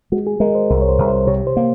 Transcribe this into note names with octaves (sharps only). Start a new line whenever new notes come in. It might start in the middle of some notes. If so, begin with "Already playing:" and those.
G#3 F#4
G#4
G#3 A#4
C5
C2 A#4
C#5
C5
C2
C5
C3 C#5
C5
A#3